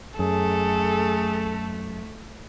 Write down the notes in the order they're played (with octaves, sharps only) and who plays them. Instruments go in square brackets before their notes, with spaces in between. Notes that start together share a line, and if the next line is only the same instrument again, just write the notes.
[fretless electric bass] F#2 [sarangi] A3 [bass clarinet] G#4 [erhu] A4